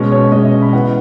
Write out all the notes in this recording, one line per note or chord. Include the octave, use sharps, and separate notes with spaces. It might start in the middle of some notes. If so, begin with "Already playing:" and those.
Already playing: B2 G#3 C#4
C#5
B2 G#3 C#4 D#5
E5
D#5
B5
E3 B3 F#5